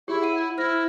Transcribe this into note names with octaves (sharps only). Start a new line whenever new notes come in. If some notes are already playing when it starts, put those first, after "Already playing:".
E4 G4 G#4 C#5
F#5 D#7
E4 C5 F6 A#6